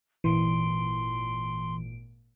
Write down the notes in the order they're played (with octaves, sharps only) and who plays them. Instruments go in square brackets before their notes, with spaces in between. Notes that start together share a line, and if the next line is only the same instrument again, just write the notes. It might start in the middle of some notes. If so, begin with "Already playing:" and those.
[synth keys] G#1 A#2 D7 [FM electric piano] E3 [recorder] C6